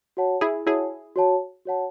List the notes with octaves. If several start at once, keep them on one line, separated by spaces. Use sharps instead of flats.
F#4 C#5 F#5 A5
E4 G#4
E4 F#4 G#4 C#5 F#5 A5
F#4 C#5 F#5 A5
F#4 C#5 F#5 A5